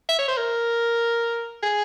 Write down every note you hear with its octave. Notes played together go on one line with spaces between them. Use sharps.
E5
C#5
C5
A#4
G#4